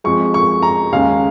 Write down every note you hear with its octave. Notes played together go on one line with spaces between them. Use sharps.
F2 F3 G#3 C#6
C#6
A#5
D#2 C#3 G#3 C#4 F5